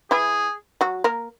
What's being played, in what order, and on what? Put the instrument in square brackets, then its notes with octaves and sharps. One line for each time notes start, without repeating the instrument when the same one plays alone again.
[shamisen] E3 E4 [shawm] G#4
[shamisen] F#3 F#4
A#3 A#4